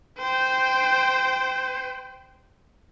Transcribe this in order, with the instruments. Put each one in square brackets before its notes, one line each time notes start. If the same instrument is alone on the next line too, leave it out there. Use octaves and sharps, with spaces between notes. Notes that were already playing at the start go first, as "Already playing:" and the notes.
[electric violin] C5 G5